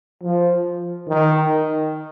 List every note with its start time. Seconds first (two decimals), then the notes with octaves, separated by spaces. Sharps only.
0.24 F3
1.08 D#3